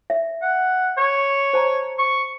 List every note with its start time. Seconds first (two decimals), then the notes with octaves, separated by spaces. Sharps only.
0.10 E5
0.42 F#5
0.98 C#5
1.54 C5 A5 A#5
1.98 C#6